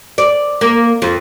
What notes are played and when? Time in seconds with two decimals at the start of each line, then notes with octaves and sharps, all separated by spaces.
0.18 D5
0.61 A#3
1.02 F2